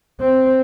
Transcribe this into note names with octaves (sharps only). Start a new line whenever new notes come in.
C4